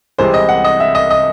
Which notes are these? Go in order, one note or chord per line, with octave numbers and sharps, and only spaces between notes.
C2 C3 E3 G#3 C5
D#5
F#5
D#5
E5
D#5
D#5